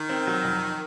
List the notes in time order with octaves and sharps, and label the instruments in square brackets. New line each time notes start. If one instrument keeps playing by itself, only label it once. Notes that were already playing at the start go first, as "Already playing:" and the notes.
Already playing: [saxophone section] D#3
[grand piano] C4
F#3
F2